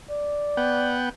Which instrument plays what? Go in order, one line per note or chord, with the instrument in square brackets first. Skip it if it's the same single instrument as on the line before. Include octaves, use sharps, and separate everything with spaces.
[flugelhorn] D5
[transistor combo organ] B3 F#5 G5